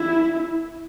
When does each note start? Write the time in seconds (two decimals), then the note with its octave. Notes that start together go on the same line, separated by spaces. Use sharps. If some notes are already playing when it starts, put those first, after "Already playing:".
Already playing: E4